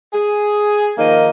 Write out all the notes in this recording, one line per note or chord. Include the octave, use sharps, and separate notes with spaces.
G#4
D#3 F3 A#3 D#4 D#5